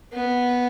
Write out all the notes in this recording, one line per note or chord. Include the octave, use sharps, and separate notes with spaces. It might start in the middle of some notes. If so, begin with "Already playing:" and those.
B3